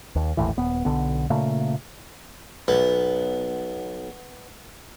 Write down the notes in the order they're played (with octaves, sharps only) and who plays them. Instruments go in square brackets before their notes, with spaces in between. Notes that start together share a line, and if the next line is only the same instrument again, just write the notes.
[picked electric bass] D#2
G#1 D#2 A2 E3
D#1 B3
B1 D3 B3
A#2 C#3 A3 A#3
[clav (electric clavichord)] B1 [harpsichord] B3